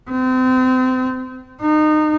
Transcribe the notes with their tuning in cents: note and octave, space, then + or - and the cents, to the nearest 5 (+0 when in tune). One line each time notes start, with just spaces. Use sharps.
C4 -35
D#4 -25